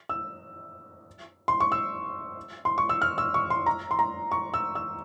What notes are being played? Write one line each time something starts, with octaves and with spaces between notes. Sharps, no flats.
E6
C6
C#6
E6
C6
C#6
E6
F6
E6
C#6
C6
A#5
C6
A#5
C#6
E6
E6